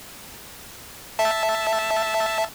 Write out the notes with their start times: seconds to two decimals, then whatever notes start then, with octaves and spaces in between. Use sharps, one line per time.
1.19 E5 A5